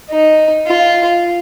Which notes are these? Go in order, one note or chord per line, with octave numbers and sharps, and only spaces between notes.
D#4
F4